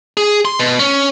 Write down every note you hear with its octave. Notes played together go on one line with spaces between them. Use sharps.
G#4
C6
B2
C#4